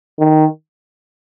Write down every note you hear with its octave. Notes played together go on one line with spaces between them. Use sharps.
D#3